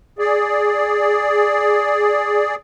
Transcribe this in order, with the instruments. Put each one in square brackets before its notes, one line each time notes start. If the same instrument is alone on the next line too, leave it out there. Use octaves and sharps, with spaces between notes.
[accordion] G#4 D5